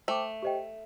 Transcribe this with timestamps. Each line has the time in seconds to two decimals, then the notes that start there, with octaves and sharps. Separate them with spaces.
0.08 A3 C5 G5 D6
0.43 G4 C5 D#5 G5